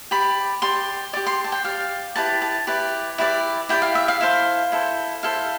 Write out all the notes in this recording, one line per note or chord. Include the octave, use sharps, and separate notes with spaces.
G4 D5 B5
G4 D5 C6
G4 D5 D6
C6
A5
G5
G4 D5 F5
E4 G4 B4 D5 A5
A5
E4 G4 B4 D5
E4 G4 B4 D5
E4 G4 B4 D5 G5
F5
E5
F5
E4 A4 C5
E4 A4 C5
E4 A4 C5 F5